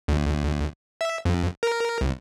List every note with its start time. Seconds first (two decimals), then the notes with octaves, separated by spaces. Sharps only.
0.08 D2
1.01 E5
1.25 F2
1.63 A#4
2.01 C2